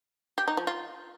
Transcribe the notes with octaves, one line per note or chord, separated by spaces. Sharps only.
G4
D#4
F3
F4